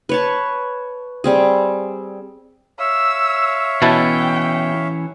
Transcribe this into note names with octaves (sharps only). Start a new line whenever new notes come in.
B4 C#5 A5
G3 C4 G#4
C#5 E5 F5 E6
B2 E3 C#4 E4 G5 A5